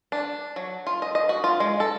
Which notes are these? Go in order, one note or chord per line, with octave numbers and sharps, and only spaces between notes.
D4
F#3
F4
D#5
D#5
F#4
F4
G#3
A4